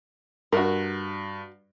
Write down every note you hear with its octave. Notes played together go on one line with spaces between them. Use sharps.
G2 F#4 A#4